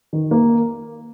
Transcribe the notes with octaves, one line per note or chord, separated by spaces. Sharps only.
D#3
A#3